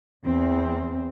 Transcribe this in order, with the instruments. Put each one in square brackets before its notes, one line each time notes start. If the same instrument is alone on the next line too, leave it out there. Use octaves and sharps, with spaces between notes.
[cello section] E2 C4